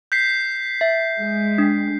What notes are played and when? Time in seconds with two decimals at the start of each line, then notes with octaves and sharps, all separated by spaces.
0.12 G6 B6 C7
0.81 E5
1.18 G#3
1.58 D4